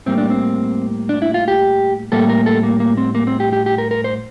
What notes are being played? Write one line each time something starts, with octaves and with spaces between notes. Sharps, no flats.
A2 G3 A#3 C4
D4
C4
D4
E4
F4
G4
A2 G3 A#3 A4
A#4
A4
A#3
A#3
C4
A#3
C4
G4
G4
G4
A#4
A#4
C5